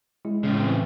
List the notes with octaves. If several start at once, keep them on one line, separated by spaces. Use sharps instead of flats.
G#3 E4
A2 C#3 G#3
E3 C4